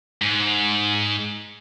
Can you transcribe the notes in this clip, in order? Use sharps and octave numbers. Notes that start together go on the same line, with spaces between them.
G#2